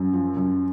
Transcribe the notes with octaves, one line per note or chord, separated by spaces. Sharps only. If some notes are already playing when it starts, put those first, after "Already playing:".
Already playing: F#2
F3
F#2